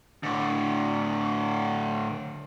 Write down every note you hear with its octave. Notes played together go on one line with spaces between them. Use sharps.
A2 D3